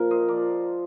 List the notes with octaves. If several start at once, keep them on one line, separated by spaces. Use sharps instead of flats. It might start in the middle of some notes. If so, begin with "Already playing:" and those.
Already playing: A#2 F3 A#4
C5 D#5
F3 A#4 D5